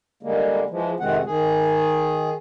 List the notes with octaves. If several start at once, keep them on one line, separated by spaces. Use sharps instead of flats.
D3 G3 G#3 A#3
E3 F3 G#3
F2 C3 D#3 G#3 C4 F#5
D#3 G#4